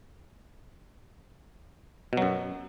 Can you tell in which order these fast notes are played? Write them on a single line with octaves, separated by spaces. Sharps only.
B2 F#3 F#2